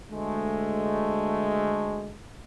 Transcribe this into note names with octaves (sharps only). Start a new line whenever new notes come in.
D2 G#3 A3